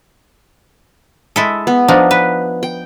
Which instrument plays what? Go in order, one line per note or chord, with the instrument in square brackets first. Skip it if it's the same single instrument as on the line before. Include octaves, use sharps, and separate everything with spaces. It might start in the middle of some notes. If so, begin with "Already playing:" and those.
[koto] G#3 E4 A4
[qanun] B3
[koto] F3 D4 D#4
B4
[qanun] G5